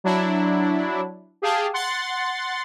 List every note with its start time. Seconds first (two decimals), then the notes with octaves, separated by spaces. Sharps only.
0.04 F#3 D4 E4
1.42 G4 G#4 F5 G5 A5
1.73 F#5 C6 A6